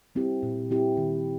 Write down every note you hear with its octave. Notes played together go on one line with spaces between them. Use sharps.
G3 C4 E4 G4
A#2
G3 C4 E4 G4
D#3